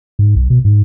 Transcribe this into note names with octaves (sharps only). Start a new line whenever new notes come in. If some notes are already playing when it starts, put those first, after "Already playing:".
G#2
B1
B2
G#2